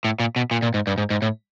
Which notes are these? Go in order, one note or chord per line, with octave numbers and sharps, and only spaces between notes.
A2
A#2
B2
A#2
A#2
G#2
G2
G#2
G#2
A2